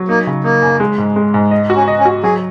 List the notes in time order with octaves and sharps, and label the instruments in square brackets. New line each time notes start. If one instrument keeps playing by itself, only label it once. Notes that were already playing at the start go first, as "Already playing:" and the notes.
Already playing: [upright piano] F#3
[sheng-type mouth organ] A#3 [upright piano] D#4
[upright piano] C#3
[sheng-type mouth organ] A#3 [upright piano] D#4
[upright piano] F#2
G#3
G#2
G#3
G#2
D#5
F#4
[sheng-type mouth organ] C#4
[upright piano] D#5
[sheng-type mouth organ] C#4
[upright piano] F#4
[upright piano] F#3 [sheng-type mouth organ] G#4